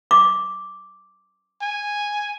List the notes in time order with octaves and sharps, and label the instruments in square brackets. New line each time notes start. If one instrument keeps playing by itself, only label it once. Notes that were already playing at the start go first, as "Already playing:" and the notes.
[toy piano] D6
[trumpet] G#5